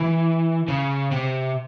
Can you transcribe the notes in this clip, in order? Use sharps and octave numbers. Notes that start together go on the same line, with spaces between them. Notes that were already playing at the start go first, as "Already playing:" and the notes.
Already playing: E3
C#3
C3